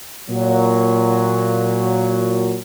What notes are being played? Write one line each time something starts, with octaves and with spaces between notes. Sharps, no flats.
A#2 F#3